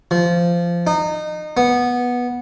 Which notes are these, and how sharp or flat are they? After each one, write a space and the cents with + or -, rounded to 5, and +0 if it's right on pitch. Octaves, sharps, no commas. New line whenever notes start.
F3 -15
D#4 -25
B3 -10